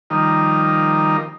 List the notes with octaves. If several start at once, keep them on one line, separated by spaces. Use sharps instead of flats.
D#3 F3 G3 A#3 D#4